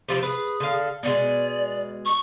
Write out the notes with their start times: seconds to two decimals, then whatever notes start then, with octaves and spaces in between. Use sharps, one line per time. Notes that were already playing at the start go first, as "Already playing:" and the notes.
0.09 C3 F3 E4
0.23 G#4 B4
0.60 D3 F5
1.03 B2 D3 G#3 D5
2.05 C#6